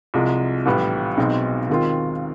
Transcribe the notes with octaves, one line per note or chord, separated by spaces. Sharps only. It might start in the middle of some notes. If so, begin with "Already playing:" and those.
C2 C3 F3 G#3
A#1 A2 E3 G3 B3
B1 B2 G#3 C4 D#4
D#2 D#3 G#3 C4 F4